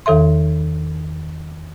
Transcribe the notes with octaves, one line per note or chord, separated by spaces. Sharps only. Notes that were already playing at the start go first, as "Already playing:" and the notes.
E2 D#3 A4 E5 C6